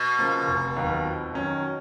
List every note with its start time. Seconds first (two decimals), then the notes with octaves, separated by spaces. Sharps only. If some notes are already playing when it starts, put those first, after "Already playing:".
Already playing: B2
0.19 C#3 F3 A#3
0.48 F1
0.76 D#2 D#3 F#3 B3
1.05 F2
1.33 D#3 F#3 C#4